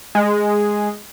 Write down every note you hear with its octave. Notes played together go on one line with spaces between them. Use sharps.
G#3